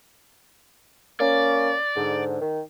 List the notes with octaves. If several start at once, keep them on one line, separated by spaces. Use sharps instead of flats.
A#3 C#4 D5
G#2 D3
D#3